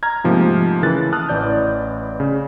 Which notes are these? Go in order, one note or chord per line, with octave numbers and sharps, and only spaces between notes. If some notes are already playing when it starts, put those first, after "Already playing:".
A#5 F6 G#6
G#2 C3 F3 A3 A#3
C#3 E3 A#4 F#6 A6
A5 D#6 F6 F#6
A1 E3 D5 G6
C#3